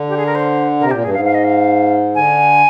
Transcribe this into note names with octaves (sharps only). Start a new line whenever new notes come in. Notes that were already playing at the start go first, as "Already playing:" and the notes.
Already playing: D3
G4
G#4
A#4
C5
C3 A#4
A#2 G4
G2 G#4
G#2 F5
F5
D#5
F5
D3 G#5